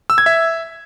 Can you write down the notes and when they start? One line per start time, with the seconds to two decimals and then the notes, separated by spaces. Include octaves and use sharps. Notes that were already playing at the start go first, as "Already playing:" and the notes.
0.10 E6
0.18 G#6
0.26 E5